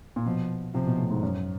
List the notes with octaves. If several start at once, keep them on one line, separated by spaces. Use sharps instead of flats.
A#2
B2 F3
C3 F3
B2
A2
G#2
F#2